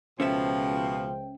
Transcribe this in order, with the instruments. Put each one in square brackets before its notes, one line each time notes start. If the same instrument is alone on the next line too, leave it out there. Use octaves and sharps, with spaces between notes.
[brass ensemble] C#2 C5 G5 [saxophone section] B2 F3 [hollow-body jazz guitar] C#4 A4 E5